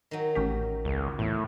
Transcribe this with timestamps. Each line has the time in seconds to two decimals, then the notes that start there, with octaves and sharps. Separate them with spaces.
0.11 D#3 F#3
0.35 A1 C#4 G4
0.85 C#2
1.19 E2 A2